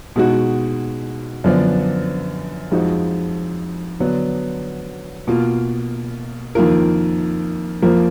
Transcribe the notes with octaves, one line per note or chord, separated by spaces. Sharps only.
B2 G#3 D#4 F#4
F#2 D3 F3 B3 D4
F2 F3 G#3 D#4 F#4
D3 F#3 B3 D4
B2 A#3 F4
F2 D#3 A#3 F4 A#4
F2 F3 A#3 F4 A#4